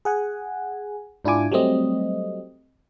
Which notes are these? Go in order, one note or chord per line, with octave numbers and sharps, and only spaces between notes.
G#4 F#5 G#5
G#2 D4 E4 F4 G#5 D6
F#3 G3 A3 C4 D#5